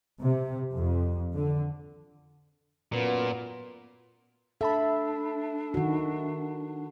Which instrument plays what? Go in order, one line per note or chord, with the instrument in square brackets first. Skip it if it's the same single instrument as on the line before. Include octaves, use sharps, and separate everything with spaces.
[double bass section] C3
F2
D3
[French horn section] F#2 B3 [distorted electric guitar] A#2
[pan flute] D4 [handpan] A4 [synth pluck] E5 A5 B5
[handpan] D#3 F#4